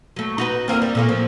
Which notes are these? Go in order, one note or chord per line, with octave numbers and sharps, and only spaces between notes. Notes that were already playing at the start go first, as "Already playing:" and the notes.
F#3 A3
D#4 F#4 B4
E2 A#3 C4
G3
A#2 A3 A#3
F3